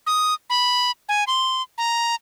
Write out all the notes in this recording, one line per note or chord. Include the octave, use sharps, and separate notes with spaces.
D#6
B5
G#5
C6
A#5